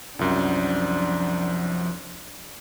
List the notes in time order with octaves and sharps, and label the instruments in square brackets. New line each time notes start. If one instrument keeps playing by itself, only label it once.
[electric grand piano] C2 F#2 [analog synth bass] F3 [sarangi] D4